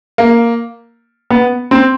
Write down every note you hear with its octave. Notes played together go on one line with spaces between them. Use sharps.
A#3
B3
C4